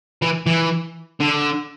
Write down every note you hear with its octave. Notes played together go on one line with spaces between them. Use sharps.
E3
E3
D3